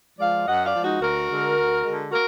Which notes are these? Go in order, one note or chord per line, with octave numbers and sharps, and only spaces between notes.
F3 G#3 D5 F5
F#2 D#5 F#5
D5 F5
F3 G#3
D#4 F#4
D2 F#4 A#4
D3 G#3
D2
D3 G#3
F#4 A#4